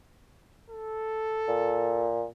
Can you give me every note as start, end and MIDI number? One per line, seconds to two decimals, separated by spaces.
0.71 2.08 69
1.48 2.26 46